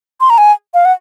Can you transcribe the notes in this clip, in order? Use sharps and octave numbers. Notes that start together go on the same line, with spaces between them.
C6
A#5
G#5
F5
F#5